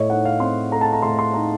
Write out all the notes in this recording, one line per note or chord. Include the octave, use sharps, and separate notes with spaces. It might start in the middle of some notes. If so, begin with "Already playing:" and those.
Already playing: A2 C#5 D#5
D#4 F#5
F5
C4 C6
A3 A#5
A5
A#5
A2 C6
C6
D#4 A#5